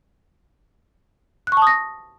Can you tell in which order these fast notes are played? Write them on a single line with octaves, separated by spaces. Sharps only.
F#6 C#6 A5 D#6 A#6